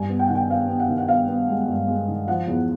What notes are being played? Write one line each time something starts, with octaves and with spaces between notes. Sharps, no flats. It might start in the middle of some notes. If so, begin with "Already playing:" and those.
Already playing: G2 G#5
B3
G5
D#3 F#5
G5
B3 F5
B3
F#5
D#3
F#5
B3 F5
B3
G#3
G2
G#3
D#3
F3 F#5
E2